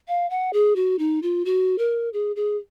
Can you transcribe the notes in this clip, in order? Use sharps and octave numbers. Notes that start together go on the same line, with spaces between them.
F5
F#5
G#4
F#4
D#4
F4
F#4
A#4
G#4
G#4